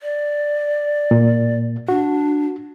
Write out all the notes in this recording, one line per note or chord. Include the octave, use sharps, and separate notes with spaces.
D5
A#2
D4 F#4